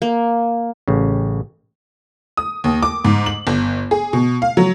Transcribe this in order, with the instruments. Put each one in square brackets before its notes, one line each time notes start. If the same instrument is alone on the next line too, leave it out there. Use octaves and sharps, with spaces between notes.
[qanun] A#3
[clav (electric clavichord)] A1 C#3
[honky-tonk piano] D#6
D#2
D6
G#2
F#7
G1
G#4
B2
F5
F#3